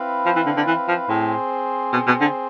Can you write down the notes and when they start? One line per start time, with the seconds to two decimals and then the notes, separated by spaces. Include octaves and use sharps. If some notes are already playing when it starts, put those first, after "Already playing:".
Already playing: C4 E4 B4 F5
0.25 F3
0.36 E3
0.46 D3
0.57 D3
0.67 E3
0.88 F3
1.08 A2 C4 G#4 C5
1.93 B2
2.07 B2
2.21 D3